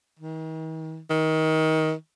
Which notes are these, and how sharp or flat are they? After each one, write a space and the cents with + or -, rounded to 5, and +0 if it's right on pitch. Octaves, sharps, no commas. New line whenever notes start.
D#3 +40
D#3 +25